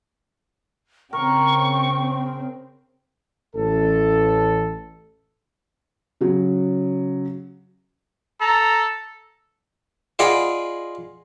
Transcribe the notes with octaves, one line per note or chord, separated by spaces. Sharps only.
C#3 C4 A#4 G5 C#6
A1 A4
C#3 F#3
A4 A#5
F4 G#4 D5 D#5 F#5 B5